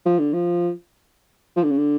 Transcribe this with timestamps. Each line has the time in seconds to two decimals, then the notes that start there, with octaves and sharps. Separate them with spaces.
0.06 F3
0.19 D3
0.33 F3
1.56 F3
1.63 D3
1.71 C#3
1.78 D3